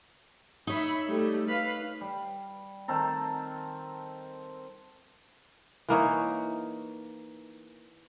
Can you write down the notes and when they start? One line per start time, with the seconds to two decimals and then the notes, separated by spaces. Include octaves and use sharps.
0.67 D#4 C#5 E5 B5
1.06 G3 A3
1.47 B4 F5 B5
2.01 G3
2.88 D#3 C4 A4 A#5
5.88 E3 A#3 D#4 C#5